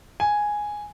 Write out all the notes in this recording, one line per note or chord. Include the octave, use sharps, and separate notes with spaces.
G#5